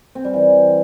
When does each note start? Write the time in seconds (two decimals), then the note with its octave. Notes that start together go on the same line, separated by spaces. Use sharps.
0.15 C4
0.24 G3
0.34 E3